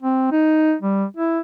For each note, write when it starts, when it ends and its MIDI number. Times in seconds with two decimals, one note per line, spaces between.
0.03 0.29 60
0.32 0.74 63
0.82 1.05 55
1.17 1.40 64